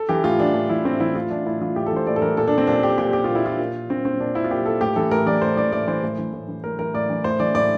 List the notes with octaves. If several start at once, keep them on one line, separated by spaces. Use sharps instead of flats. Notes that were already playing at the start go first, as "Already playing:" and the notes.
Already playing: A4
E3 G4
A2 F4
E3 D4
A2
E3 E4
A2 C4
E3 E4
A2 F4
E3 D4
A2 E4
E3 F4
A2 G4
A4
E3 C5
A2 D5
A4
E3 A#4
A#2 A4
D4
C4
A#2 D4
G4
A#2 G4
G4
A#2 F4
E4
F4
A#2
A#2 C4
C4
A#2 D4
E4
F4
A#2 G4
A4
A2 G4
E3 A4
A2 A#4
E3 D5
A2 C5
E3 D5
A2 D5
E3 C5
A2
E3
A2
E3
A2 A#4
E3 A#4
A2 D5
E3
A2 C5
E3 D5
A2 D5